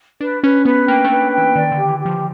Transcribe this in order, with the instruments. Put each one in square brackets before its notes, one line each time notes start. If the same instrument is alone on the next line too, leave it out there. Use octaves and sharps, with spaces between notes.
[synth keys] D4 [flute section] B4
[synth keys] C#4 [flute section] B4
[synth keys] B3 [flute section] B4
[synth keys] A#3 [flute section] G5
[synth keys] A3
[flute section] B4
[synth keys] A3
[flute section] G5
[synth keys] E3
[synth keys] D#3 [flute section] D5
[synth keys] D3
[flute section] G4
[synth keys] E3
[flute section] G4
[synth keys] F3